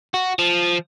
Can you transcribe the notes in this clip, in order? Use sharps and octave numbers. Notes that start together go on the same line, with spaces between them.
F#4
F3